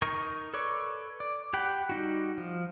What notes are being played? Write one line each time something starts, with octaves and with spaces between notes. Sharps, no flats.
D#4 A#4 C#6
A4 B4 C#5 D5 C#6
D5
G4 F#5 G5 B5
G3 D#4 F#4
F3